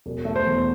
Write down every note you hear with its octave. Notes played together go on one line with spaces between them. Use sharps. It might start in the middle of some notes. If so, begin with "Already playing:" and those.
E1
A3
C5
E2